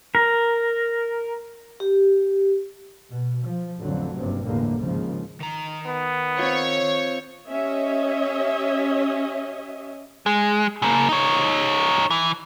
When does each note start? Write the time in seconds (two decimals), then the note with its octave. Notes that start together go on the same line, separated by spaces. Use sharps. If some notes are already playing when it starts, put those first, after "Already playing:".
0.15 A#4
1.80 G4
3.12 B2
3.45 F3
3.79 A1 F2 A2 D3 F#3
4.15 F#1 G2 C3
4.44 G1 E2 A2 D3 A#3
4.80 D#2 G#2 C#3 F3
5.40 D#3 A#5
5.87 B3
6.39 C4 F4 C#5
7.49 C#4 G4 C#5 D#5 E5
10.26 G#3
10.82 C#3 A#3
11.09 D#4 C#5
12.10 E3